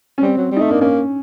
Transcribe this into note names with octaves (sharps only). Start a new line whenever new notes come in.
C#4
G3 C4
F#3
G3
A3 D#4
A#3 D4
A#3 C#4